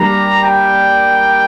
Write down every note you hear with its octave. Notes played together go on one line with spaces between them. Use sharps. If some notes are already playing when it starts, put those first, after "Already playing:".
Already playing: G3 A#3 D4 G4 A#5
G5